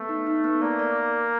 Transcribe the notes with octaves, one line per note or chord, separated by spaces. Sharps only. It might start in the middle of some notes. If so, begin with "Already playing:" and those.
Already playing: A3 B3
D#4
D#4
B3
A#3 D5
D5